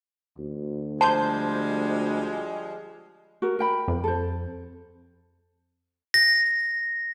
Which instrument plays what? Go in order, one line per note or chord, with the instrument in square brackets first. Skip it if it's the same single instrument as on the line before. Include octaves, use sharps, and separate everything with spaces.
[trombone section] D2
[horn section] F3 G3 G#3 [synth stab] C5 G6 [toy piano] A5
[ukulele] F#4 A#4
A#4 G5 B5
[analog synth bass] F2
[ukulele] A4 C5
[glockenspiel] A#6